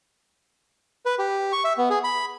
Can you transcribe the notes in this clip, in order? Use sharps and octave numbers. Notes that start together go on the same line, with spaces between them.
B4
G4
C#6
E5
B3
G#4
B5